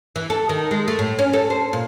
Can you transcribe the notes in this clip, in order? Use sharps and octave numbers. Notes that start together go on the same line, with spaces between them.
E3
A4
D#3
G#3
A3
A2
C#4
A4
C5
A#2